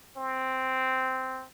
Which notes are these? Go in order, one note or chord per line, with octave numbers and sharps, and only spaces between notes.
C4